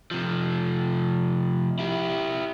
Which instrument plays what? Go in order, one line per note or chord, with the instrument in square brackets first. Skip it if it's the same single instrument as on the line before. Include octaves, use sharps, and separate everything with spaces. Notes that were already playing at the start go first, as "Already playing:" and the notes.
[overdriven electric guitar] C3 F3
E4 G4